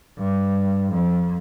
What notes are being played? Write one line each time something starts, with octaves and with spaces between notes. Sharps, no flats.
G2
F2